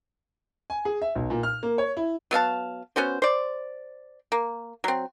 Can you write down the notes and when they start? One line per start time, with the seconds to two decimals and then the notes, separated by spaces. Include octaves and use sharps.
0.70 G#5
0.85 G#4
1.02 E5
1.15 B1
1.30 A#2
1.43 F6
1.63 A#3
1.78 C#5
1.97 E4
2.31 F#3 B3 F5 A5
2.96 B3 C#4 F#4 C5
3.22 C5 D5
4.32 A#3
4.84 F#3 C4